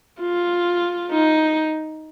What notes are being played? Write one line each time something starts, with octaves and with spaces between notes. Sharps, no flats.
F4
D#4